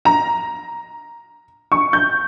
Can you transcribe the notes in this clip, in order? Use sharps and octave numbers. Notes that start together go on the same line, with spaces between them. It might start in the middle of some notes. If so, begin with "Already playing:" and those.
A#5
C#6
G6